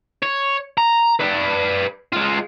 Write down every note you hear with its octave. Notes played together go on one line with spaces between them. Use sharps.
C#5
A#5
B4 D5
G#3 F4